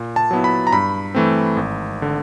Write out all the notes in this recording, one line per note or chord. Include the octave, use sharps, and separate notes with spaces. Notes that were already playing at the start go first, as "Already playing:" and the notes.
Already playing: A#2
A5
F#3 B3 E4
B5
A#5
G2 B5
E3 A3 C4
G#1
D3